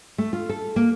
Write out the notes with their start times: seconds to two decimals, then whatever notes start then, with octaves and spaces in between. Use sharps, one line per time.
0.18 A3
0.33 F4
0.49 A4
0.76 A#3